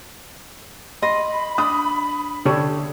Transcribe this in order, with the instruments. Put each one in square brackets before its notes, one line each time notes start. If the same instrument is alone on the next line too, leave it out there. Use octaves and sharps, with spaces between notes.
[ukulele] D#5 [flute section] B5 [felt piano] C6
[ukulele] D4 [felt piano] D#6
[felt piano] D3 [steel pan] G4 A4 C#5